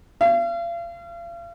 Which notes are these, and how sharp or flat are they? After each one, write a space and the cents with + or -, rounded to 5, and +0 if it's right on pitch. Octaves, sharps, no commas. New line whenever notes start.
F5 -40